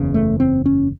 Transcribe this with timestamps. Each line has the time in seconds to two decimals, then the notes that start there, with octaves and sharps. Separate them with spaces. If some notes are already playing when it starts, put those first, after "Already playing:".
Already playing: F#1 E2 C#3
0.14 A3
0.40 C4
0.66 C#4